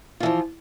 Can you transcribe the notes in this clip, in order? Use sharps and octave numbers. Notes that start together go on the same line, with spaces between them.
E3 F3 F4